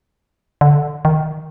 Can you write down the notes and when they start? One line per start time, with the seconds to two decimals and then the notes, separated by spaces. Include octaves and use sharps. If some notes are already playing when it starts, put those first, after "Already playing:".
0.61 D3
1.05 D#3